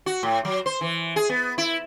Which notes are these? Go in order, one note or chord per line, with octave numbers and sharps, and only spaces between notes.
F#4
A2
F#3
C5
E3
G#4
B3
E4